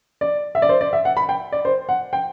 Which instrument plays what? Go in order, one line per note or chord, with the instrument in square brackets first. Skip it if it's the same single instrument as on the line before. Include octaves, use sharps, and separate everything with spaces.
[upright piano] D5
E5
D5
C5
D5
E5
F#5
B5
G5
D5
C5
F#5
G5